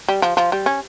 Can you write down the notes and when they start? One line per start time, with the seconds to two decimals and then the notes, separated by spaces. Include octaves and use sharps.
0.09 G3
0.22 F3
0.37 F3
0.52 G3
0.66 C#4